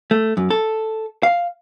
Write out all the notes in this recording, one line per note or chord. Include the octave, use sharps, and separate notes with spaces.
A3
F#2
A4
F5